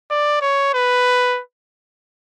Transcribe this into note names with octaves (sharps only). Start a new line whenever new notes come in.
D5
C#5
B4